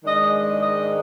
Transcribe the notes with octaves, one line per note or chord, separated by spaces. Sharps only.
G#2 D#3 G#3 D4 D#5
D#5
D#5